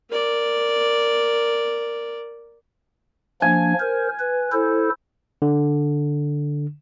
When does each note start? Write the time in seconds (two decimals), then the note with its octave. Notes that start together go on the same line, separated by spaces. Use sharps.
0.10 A#4 D5
3.42 F3 A#3 D4 G#5
3.80 A#4 C5
4.19 B4
4.52 E4 A4 C5
5.42 D3